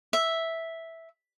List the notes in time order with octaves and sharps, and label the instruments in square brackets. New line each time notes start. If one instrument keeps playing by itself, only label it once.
[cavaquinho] E5